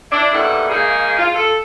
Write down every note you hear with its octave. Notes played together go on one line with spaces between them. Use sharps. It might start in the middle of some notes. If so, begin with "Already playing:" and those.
D4 E4
D#2 B2 G3 E4 A4 F#5
G#2 C#3 A#3 D#4 G#4
F4
A4